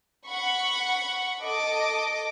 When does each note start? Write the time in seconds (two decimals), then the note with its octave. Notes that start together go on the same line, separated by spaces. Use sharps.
0.27 F#5 B5 C#6
1.42 A4 D#5 D6